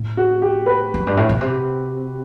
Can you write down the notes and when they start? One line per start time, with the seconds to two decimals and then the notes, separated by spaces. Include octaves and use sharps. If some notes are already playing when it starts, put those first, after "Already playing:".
Already playing: A2
0.17 F#4
0.42 G4
0.66 B4
0.94 F#2
1.07 G2
1.17 A2
1.29 B2
1.41 C3